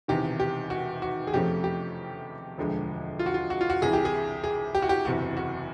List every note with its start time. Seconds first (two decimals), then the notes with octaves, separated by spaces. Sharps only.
0.08 E1 E2 C3 D#3 G4
0.40 G4
0.70 F#4
1.02 F#4
1.27 G#4
1.33 F2 C3 F3 A3 C#4 G4
1.64 G4
2.57 E1 D2 D3 F3 G#3
3.19 F4
3.26 F#4
3.34 F4
3.50 F#4
3.61 F4
3.70 F#4
3.82 C2 C3 E3 G#4
3.93 G4
4.05 G#4
4.44 G#4
4.75 G4
4.82 F#4
4.89 G4
5.05 F#1 E2 C3 F#4
5.37 F#4